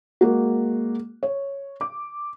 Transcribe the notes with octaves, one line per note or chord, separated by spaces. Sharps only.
G#3 A#3 F#4
C#5
D6